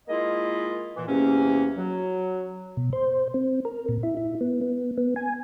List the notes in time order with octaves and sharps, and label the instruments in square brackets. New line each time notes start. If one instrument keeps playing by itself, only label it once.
[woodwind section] G#3 A#3 E4 F4 D#5
A#2 E3
E2 C3 A#3 C#4
F#3
[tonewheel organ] B2
C5
C4
A#4
A#2
E4
E4
B3
B3
B3
G#5